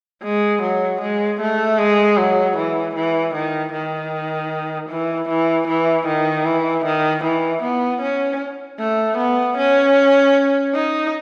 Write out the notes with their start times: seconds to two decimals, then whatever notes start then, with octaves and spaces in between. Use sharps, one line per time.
0.24 G#3
0.62 F#3
1.01 G#3
1.40 A3
1.78 G#3
2.17 F#3
2.57 E3
2.96 E3
3.34 D#3
3.73 D#3
4.89 E3
5.29 E3
5.68 E3
6.07 D#3
6.45 E3
6.85 D#3
7.24 E3
7.63 B3
8.02 C#4
8.79 A3
9.17 B3
9.57 C#4
10.74 D#4